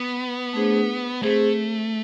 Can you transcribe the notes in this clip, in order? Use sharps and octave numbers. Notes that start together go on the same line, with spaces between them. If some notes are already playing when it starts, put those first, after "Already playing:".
Already playing: B3
A3 D4 G#4 C5
A3 C4 G#4 C5